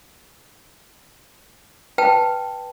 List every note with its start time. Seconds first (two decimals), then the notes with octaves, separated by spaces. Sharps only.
1.98 B4 G5 A5